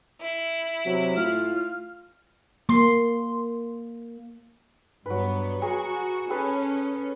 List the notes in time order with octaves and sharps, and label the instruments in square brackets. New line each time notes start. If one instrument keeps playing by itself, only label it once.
[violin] E4
[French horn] C3 [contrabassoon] F#3
[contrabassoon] A2 [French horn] F4 [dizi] F6
[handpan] A#3 [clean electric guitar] C6
[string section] G2 B3 [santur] F#3 B4
[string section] F#4 C#6 [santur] G#4 G#5 A#5
[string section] C#4 [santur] G#4 A4 B4